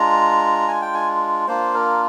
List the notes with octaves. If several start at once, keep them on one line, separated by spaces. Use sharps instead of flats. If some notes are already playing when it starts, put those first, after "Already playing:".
Already playing: G#3 D4 F4 A#5
G#5
G5
G#5
A#3 D4 F4 C5
A#4